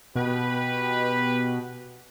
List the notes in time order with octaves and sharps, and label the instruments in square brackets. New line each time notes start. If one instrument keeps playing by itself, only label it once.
[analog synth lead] B2 [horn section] G4 B4